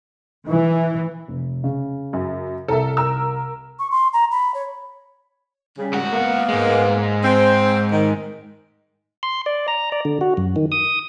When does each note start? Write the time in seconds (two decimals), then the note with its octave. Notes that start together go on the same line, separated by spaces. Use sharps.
0.48 E3
1.28 F1
1.64 C#3
2.13 F#2
2.68 C2 A4 A#4 E5
2.97 A#4 E6
3.79 C#6
3.91 C6
4.13 A#5
4.31 B5
4.54 C#5
5.77 C#3 G3
5.94 G#2 F#4
6.12 A#3 B3
6.48 G#2 G#3
7.23 C4
7.92 D#3
9.23 C6
9.46 D5
9.68 A#5
9.92 D5
10.05 D3
10.21 F#4
10.37 F#2
10.56 D#3
10.72 D#6